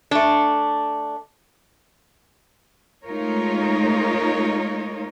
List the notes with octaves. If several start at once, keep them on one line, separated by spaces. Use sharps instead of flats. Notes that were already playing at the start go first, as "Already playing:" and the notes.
A3 D4
G#3 A3 D#4 F4 A#4 C#5